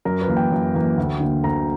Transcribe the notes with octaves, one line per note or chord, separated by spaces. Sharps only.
F#2 A#4
B4
E3 A#3
G5
F#2
E3 A#3
D2
D3 A#3
D2 A#5